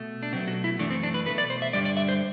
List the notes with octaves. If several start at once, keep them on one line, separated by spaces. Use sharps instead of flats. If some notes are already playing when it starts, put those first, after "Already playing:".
Already playing: B2 A3
D4
B2 F#3 A3 C4
F#4
E4
F#2 E3 A3 D4
C4
D4
B4
B2 A3 B4
D5
C5
E5
G2 D3 G3 D5
D5
E5
C5